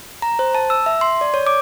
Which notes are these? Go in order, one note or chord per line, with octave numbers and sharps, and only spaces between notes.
A#5
C5
A5
E6
E5
C6
D5
C#5
D6